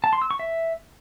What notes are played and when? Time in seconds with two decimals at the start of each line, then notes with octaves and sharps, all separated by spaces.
0.04 A5
0.13 C6
0.22 E6
0.31 C#6
0.39 E5